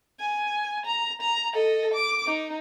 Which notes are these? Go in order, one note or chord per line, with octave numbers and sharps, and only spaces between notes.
G#5
A#5
A#5
A4 D#5
D6
D#4